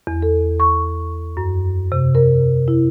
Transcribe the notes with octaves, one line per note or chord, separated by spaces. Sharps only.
E2
A4
C#6
F#2
C3
A#4
E4